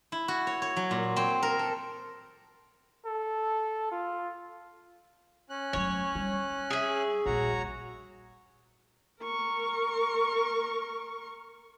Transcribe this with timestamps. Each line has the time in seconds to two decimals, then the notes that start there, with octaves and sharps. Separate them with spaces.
0.12 E4
0.28 F#4
0.47 C#5
0.62 C#5
0.77 F#3
0.91 A#2
1.16 C4
1.43 A#4
1.59 A4
3.05 A4
3.92 F4
5.50 C#4 F#6
5.73 F1 F#3 C#5
6.16 G3
6.70 G#4 E5
7.26 D#1 A#1 F#4 C#5 A#5
9.21 A#4 C#6